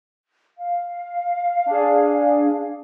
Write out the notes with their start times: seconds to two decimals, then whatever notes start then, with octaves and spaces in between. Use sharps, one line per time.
0.59 F5
1.66 D4 G#4